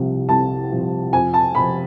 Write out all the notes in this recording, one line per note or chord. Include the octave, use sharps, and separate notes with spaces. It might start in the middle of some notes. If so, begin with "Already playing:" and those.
Already playing: C2 C3 F3
C2 A5
C3 F3
F2 G#5
A5
C3 F3 B5